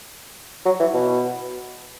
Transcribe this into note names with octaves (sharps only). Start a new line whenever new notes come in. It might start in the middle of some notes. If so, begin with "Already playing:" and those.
F#3
E3
B2